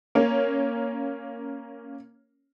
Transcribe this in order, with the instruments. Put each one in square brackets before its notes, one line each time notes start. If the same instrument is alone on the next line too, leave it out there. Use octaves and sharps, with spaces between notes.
[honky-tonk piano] A#3 C#4